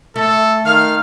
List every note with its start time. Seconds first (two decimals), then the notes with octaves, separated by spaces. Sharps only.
0.16 A3 A4
0.65 D#3 F5 F6